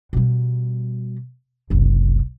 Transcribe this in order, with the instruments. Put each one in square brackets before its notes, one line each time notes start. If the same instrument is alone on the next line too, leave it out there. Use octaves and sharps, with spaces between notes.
[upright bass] B2 G3
F#1 C2